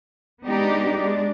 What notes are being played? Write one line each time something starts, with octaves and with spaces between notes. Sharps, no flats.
G#3 B3 D4 D#4 G4
G#3 D4